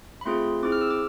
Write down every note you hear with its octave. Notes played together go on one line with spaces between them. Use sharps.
B5
A3 C4 F4 G#4 C6
C4 E4 G#4 D6
F6
E6
D6